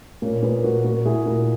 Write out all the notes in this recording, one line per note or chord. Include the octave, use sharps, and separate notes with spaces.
A#2 A#3 C#4
A#2 G#4 B4
A#2 F#4 A#4
A#2 F#4 A#4
A#2 E4 G#4
A#2 F#4 A#4